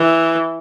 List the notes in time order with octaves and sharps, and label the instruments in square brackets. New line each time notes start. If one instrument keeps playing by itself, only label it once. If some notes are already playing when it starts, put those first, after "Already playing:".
Already playing: [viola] E3